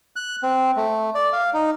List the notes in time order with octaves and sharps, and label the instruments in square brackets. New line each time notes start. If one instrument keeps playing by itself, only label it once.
[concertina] F#6
C4
A3
D5
F5
D#4